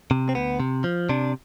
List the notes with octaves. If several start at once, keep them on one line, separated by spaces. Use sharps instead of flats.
C3
C4
D2 B3
C3
F3
C3 D4